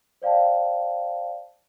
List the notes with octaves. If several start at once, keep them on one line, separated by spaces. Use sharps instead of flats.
C5 D5 F5 G5 A5